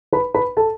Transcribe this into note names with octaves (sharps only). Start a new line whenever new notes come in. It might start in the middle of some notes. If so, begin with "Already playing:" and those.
B4 B5
B4 B5
A4 A5